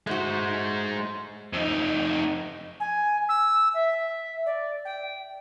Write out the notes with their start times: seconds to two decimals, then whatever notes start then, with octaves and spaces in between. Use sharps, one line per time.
0.07 G#3 A3 F#4 C5
1.53 F2 D#4
2.80 G#5
3.29 E6
3.74 E5
4.46 D5
4.85 G5